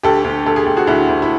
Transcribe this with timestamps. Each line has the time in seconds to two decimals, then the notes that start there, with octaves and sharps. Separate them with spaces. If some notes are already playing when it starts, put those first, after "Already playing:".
0.03 D2 G4 A4
0.24 D2
0.46 D2 A4
0.56 G#4
0.66 D2 G4
0.77 F#4 G#4
0.87 D2 E4 F#4
1.09 D2
1.22 E4